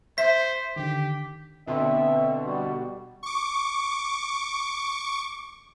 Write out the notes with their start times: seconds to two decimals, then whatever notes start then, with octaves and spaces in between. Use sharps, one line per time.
0.18 C5 E5 B6
0.76 D3 D#3 G4
1.67 B2 D3 C4 E5
2.46 G3 F#4
3.23 C#6 D6